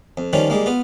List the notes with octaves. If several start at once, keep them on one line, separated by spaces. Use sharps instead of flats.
F2
D#3 F3 G3 C#4 F4
G3 G#3 A#3
B3 F4